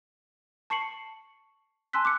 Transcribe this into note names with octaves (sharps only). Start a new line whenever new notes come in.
A5 C#6 C7 C#7 F#7
G#5 A5 C6 E6 F#6 B6
D6 F#6 C#7